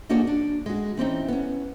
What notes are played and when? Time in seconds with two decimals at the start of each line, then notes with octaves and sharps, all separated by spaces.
0.09 A#3 D4 D#4 F#4 G#4 C#5
0.27 D4
0.66 G#3 F#4
0.97 E3 C4 C#4 D#4
1.28 B3 C#4